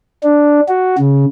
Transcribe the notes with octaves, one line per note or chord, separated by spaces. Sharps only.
D4
F#4
C#3